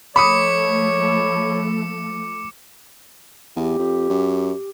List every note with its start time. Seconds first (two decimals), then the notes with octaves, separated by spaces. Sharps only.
0.16 F3 A3 C#5 B5 D6 D#6 C#7
3.56 E2 G4
3.79 F2
4.10 F#2